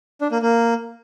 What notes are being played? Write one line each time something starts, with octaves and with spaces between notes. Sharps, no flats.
D4
A#3
A#3